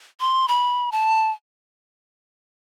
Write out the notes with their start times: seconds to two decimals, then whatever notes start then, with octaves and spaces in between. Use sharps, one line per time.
0.20 C6
0.48 B5
0.92 A5